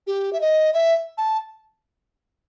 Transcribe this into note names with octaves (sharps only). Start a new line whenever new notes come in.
G4
E5
D#5
E5
A5